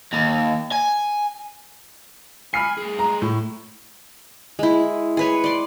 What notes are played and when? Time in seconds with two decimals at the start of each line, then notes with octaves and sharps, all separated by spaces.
0.13 D#2
0.72 G#5
2.54 G#5 B5 F6 C7
2.78 A3 G#4
2.99 A#5
3.22 A2
4.59 G#3 E4
5.17 G#4 B4 C#5
5.44 D5 C6